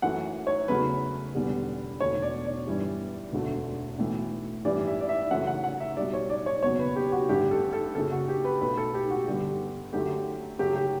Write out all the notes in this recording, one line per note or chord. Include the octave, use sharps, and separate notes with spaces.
F#2 E3 A3 F#5
C#5
E2 C#3 F#3 A3 B4
E1 E2 D3 G3
E1 E2 B2 A3 C#5
D5
D5
G1 G2 E3 G3
E1 D2 D3 A3
B1 A2 E3
A1 G2 E3 G3 D5
E5
D5
E5
F#2 C#3 E3 A3 F#5
F#5
F#5
E5
B1 B2 G3 D5
C#5
D5
C#5
F#1 E2 B2 F#3 C#5
B4
G4
F#4
A1 G2 D3 A3 G4
A4
A4
F#1 F#2 C#3 A4
F#4
G4
B4
B1 B2 A3 B4
A4
G4
F#4
G1 G2 D3 G3 G4
F#2 D3 F#3 A3 G4
F#2 C#3 F#3 A3 G4
G4